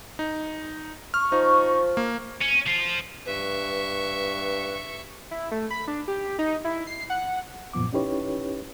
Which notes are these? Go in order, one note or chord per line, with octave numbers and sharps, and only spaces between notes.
D#4
C#6 F6
F3 D#4
A#3
C#4
F3 F4
G2 B4 E5 C#6
E4
A3
B5
D4
G4
D#4
E4
C7
F#5
F#2 A#2 F3 B3 D6
C#4 D#4 E4 G4 B4 C#5